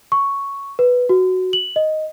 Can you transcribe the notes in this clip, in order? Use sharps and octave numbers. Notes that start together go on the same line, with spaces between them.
C#6
B4
F#4
F#7
D#5